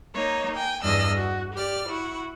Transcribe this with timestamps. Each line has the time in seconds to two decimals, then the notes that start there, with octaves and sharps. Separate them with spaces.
0.15 A#3 D#4 C#5 D#5
0.53 G5 G#5
0.83 E2 G2 D4 D#5 E6 F6
1.16 F#4
1.53 G4 D5 F6
1.87 E4 F#4